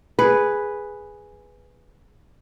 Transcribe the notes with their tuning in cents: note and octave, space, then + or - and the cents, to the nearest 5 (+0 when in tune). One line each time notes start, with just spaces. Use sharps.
G#4 +0 B4 +0